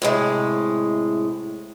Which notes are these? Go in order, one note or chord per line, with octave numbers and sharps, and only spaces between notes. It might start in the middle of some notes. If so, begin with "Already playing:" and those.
A2 C3 G#3